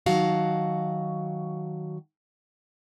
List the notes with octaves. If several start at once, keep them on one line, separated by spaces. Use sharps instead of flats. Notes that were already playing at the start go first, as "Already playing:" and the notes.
D#3 F#3 F#4 F5 A5